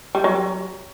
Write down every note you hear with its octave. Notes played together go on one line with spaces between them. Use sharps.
G3
F#3